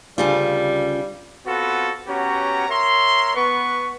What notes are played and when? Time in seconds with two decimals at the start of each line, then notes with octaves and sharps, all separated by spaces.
0.18 D2 C#3 G3 F4
1.46 B3 C4 F4 F#4 A4 B4
2.06 B3 C#4 F#4 G4 C#5 A#5
2.68 A#4 C#5 E5 A#5 C6
3.35 B3 B4 C#6